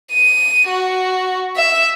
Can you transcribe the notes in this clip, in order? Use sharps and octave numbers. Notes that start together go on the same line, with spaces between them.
D#7
F#4
E5